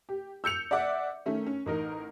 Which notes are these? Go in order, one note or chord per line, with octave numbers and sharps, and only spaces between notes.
G4
E6 G6 C#7 F7
D5 E5 F#5 D6
D#3 A3 C#4
C#4
A1 D#4 A#4